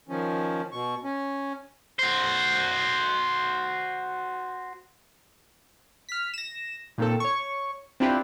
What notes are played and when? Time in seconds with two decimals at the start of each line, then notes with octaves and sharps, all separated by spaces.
0.09 D#3 F3 C#4
0.72 B2 C#6
1.04 C#4
1.99 F#4 C5
6.09 F6 B6
6.34 A#6 E7
6.98 A#2 D#3 A#3 C4 A4
7.20 C#5 C#6
8.00 C4 D4 E4 F4 G4 B4